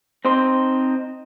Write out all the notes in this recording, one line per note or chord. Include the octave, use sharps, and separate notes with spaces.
C4 D#4 C5